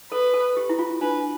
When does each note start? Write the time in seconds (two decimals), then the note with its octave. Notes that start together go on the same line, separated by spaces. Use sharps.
0.12 A4 B4
0.34 A4
0.57 G4
0.69 E4
0.79 F4
1.01 D4 B4